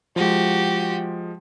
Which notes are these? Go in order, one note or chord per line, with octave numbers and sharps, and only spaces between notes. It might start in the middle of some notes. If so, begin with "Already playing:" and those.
F3 G#3 F#4 G4